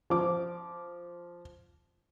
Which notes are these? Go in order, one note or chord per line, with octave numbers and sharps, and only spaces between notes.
F3 D6